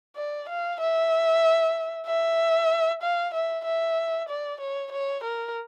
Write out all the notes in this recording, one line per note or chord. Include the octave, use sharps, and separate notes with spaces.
D5
F5
E5
E5
F5
E5
E5
D5
C#5
C#5
A#4